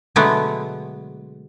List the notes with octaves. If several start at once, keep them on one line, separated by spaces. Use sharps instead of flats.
B2 D3 F#3 G#3 A3 B3